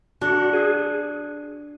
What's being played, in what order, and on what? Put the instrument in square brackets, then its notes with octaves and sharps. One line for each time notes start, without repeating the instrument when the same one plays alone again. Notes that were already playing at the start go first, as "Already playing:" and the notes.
[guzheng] D4 [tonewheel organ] F#4
[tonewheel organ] G#4